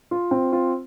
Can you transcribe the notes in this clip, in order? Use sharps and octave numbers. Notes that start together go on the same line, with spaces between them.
F4
C4
F4